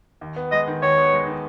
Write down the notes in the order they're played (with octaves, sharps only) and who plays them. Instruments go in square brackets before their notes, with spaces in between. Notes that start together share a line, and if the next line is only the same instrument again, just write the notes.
[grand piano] D#2
B3
[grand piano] G#3 [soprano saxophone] D#5
[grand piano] D#3
[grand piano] D#2 [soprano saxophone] C#5
[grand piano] B3
G#3
D#3